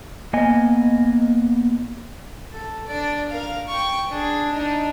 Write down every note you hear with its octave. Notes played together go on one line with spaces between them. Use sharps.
A#3 B3 D#5 G#5
A4
D4 D5
A#4 F5
G5 C#6
D4 G#4
D4 D#4